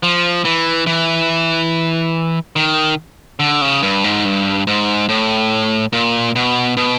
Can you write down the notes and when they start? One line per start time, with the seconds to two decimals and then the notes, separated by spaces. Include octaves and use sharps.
0.03 F3
0.45 E3
0.87 E3
2.56 D#3
3.39 D3
3.61 C#3
3.83 G2
4.04 G#2
4.25 G2
4.67 G#2
5.09 A2
5.93 A#2
6.36 B2
6.77 B2